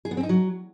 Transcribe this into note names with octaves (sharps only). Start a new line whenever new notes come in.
G#4
B3
C4
D#4
F#3